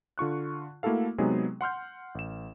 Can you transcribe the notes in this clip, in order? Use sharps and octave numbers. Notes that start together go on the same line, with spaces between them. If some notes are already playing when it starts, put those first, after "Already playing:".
D3 F4 C#6 F#6
A3 A#3 E4 F#4 A4 F5
C3 F#3 G#3 B3 D#4 G#4
F#5 C6 F6 G6
A1 E7